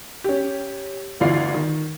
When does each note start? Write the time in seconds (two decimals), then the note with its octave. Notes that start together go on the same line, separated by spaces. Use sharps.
0.24 C#4 G4
1.20 G1 D2 E3 F4 D5 C7
1.54 D#3